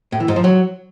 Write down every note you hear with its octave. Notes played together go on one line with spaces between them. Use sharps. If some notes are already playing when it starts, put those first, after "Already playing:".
A2
E3
G#2
F3
F#3